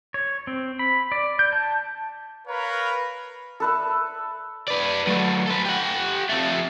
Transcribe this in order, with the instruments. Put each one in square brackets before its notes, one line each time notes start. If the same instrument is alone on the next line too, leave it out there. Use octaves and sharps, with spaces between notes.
[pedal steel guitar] C#5
C4
B5
D5
G6
A5
[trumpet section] A#4 B4 C#5 F5 A#5 B5
[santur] A4 B4 E5
[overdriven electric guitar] B4 D5
F#3 A3
A4 B4
G4 F#5
F2 A3